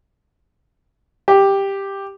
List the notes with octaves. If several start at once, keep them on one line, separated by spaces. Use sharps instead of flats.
G4